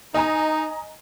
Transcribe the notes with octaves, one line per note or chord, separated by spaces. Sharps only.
D#4 D#5 G#5 A#5